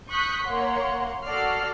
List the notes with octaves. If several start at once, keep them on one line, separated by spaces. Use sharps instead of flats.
C#6 D#6 F#6 G6 B6
A#3 C#5 F#5 C6
F#4 A4 D5 F6 C7